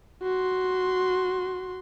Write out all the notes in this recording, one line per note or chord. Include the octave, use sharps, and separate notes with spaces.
F#4 C6